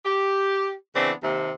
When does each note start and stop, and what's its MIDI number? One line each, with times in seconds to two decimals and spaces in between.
0.05 0.73 67
0.96 1.12 49
0.96 1.12 52
0.96 1.12 59
0.96 1.12 60
0.96 1.12 62
1.23 1.50 39
1.23 1.50 48